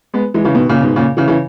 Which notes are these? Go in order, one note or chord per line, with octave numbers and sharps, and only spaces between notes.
G#3 B3
E3 G#3
C#3 E3
B2 D#3
A#2 C#3
G#2 B2
A#2 C#3
C#3 E3
C#3 E3